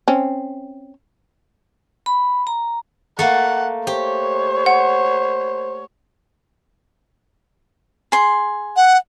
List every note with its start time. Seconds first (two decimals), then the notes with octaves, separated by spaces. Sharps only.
0.08 C4 C#4
2.06 B5
2.47 A#5
3.19 A3 A#3 F#5
3.87 G4 C5 C#5
4.66 F#5
8.12 G#4 C6
8.76 F#5